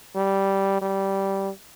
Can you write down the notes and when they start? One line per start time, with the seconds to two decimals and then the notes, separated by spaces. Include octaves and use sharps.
0.15 G3
0.81 G3